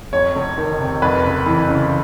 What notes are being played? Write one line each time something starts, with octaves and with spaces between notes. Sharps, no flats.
F2 C#5
F1
D#3
C3
F2 B4
F#1
E3
C#3